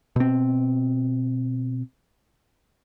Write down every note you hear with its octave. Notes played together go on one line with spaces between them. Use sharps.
B2 C4